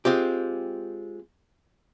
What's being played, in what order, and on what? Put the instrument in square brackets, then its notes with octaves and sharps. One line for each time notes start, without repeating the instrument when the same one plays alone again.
[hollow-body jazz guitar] G#3 C4 F4 G4